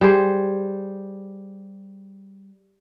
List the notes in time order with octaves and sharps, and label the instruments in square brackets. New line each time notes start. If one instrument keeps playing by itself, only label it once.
[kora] G3 G#4 C5